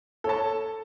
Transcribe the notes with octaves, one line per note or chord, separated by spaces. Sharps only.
A4 C#5 A5